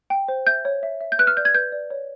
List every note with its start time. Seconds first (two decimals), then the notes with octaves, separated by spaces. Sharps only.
0.10 G5
0.28 C5
0.47 E5 G6
0.65 C#5
0.83 E5
1.01 E5
1.12 G6
1.19 B4 F#6
1.27 F6
1.37 D5 G6
1.45 G#6
1.54 B4 G6
1.72 D5
1.90 C#5